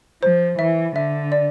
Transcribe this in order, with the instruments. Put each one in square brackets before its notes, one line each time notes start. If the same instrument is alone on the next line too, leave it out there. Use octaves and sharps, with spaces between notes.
[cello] F3 [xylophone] C5
[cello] E3 [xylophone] E5
[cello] D3 [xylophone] E5
[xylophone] D5